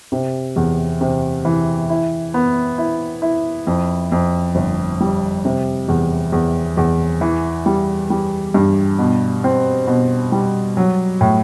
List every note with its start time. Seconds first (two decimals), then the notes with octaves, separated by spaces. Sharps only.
0.12 C3
0.56 E2
1.01 C3
1.45 E3
1.90 E4
2.34 B3
2.78 E4
3.22 E4
3.67 F2
4.12 F2
4.55 G1
5.00 G3
5.45 C3
5.88 E2
6.32 E2
6.77 E2
7.21 E3
7.66 G3
8.10 G3
8.54 G2
8.99 B2
9.44 C4
9.87 B2
10.32 G3
10.77 F#3
11.21 A2